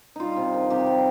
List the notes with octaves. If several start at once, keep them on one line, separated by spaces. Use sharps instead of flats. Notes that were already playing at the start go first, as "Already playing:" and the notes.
G3 D#4 F4
C3
D#3
C3 G4
G3